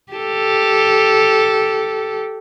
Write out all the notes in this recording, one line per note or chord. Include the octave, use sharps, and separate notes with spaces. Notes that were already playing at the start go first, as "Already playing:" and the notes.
G4 A4